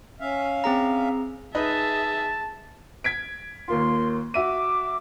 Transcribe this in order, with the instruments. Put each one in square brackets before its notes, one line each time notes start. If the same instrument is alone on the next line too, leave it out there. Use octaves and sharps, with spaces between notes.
[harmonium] C#4 E5 F5
[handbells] C4 G#4 A#5
[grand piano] D#4 B4 D#5 [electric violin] G#4 E5 [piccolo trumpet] A5
[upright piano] G#6 B6 D7
[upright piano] D#2 A#3 F4 [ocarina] C6
[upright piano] F#4 E5 D#7 [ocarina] D6